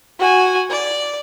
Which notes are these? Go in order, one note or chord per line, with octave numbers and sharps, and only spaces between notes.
F#4 G#5
D5